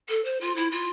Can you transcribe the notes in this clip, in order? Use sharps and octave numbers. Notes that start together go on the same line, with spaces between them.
A4
C5
F4
E4
F4